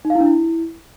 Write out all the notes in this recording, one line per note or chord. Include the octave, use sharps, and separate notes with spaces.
D#4
F5
E4
D4
E4